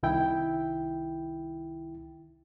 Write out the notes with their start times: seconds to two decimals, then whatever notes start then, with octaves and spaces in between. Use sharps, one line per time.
0.03 C2 D#3 E4 G5